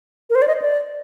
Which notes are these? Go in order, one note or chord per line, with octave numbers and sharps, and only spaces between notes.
A#4
C5
D5
D#5
D5